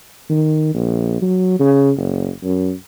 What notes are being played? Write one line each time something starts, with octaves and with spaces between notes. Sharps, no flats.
D#3
A#1
F#3
C#3
F#1
F#2